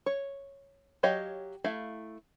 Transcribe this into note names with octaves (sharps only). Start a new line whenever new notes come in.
C#5
F#3 G4 C#5 D#5 F5
A3 E4 E5 F5